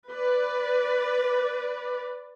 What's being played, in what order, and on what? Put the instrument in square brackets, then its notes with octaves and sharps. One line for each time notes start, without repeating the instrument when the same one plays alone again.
[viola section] B4 D5